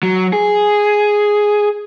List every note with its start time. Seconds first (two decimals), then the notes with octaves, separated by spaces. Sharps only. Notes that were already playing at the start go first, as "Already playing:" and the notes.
0.03 F#3
0.33 G#4